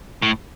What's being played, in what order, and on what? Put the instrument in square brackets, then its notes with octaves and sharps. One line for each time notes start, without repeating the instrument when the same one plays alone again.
[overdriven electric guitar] A2